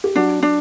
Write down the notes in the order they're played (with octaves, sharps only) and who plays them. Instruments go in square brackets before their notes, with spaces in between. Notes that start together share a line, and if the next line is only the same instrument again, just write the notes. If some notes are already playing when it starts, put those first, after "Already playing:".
[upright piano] G4
[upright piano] F#3 F#4 [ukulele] D4
[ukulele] D4